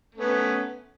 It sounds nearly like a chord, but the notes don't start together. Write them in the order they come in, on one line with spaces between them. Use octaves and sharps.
A3 C#4 B3